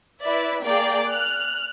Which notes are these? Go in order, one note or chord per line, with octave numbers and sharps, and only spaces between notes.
E4 B4 D5 E5
A#3 G#4 D5 G5 D6
F6 F#6